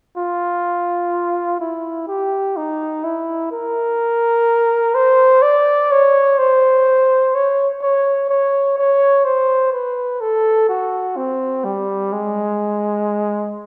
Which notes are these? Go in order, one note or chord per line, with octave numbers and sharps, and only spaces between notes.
F4
E4
G4
D#4
E4
A#4
C5
D5
C#5
C5
C#5
C#5
C#5
C#5
C5
B4
A4
F#4
C4
G3
G#3